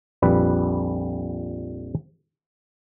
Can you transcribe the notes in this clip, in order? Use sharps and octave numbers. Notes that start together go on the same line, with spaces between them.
A#1 F2 G3 B4